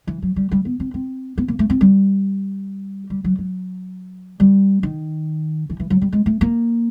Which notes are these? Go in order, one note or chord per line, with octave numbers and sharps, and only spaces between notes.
E3
F#3
G3
G3
B3
C4
C4
B3
A#3
A3
C4
G3
G3
F#3
F#3
G3
D#3
E3
E3
F#3
G3
G#3
A3
A#3